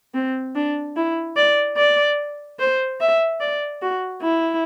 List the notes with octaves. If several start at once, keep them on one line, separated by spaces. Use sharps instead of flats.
C4
D4
E4
D5
D5
C5
E5
D5
F#4
E4